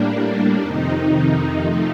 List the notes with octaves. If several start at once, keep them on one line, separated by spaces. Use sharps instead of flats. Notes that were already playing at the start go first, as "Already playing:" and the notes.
Already playing: A2 G3 A#3 D4
F2 C3 D#3 D#4
C3 F3 A3 D#4